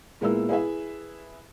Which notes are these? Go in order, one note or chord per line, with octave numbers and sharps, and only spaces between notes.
A#2 G#3 B3 E4 A#4 E6
E4 G#4 B4 E5